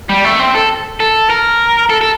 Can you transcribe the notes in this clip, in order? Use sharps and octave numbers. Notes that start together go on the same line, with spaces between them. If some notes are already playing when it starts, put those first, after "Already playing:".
G3
A3
C4
A4
A4
A#4
A4
A4